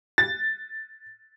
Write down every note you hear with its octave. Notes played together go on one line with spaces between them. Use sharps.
A6